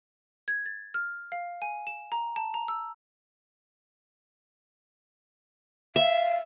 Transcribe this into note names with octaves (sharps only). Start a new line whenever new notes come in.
G#6
A6
F6
F5
G#5
E7
A#5
A5
A#5
E6
E5 F5